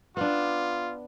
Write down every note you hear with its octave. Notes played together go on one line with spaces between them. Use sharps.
B3 D4 F4